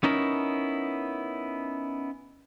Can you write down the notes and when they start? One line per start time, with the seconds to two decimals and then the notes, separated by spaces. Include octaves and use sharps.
0.03 B3 C#4 D#4 E4 A#4